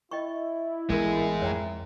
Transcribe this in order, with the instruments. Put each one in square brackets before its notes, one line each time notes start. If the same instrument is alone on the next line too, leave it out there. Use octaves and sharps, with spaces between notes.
[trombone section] E4 [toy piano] D#5 G5 C#6
[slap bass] A1 E3 B3 [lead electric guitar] G#2 G#3 [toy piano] A4 A#4
[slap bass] F2 [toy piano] C#5 G5 A#5